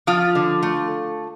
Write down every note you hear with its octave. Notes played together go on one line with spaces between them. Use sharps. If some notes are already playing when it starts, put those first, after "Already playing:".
F3 F4
D3
A3